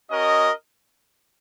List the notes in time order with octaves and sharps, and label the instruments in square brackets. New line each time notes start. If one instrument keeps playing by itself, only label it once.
[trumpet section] C#4 F#4 A#4 D#5